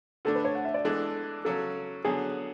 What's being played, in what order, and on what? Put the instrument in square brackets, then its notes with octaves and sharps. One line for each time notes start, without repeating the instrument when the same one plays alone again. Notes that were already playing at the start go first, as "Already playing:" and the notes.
[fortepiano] D3 A3 D4 [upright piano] A4
[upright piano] B4
C#5
F#5
E5
D5
[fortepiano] E3 G#3 D4 [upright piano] A4
[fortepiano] C#3 F#3 C#4 [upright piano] A4
[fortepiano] D3 F#3 B3 [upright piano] G#4